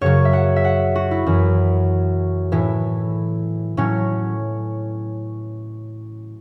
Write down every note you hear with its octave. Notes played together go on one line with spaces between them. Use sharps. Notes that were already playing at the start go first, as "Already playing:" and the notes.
F#2 C#3 F#3 C#5
E5
F#5
E5
F#5
F#4
E4
F#2 E3
A2 E3 E4
A2 F#3 C#4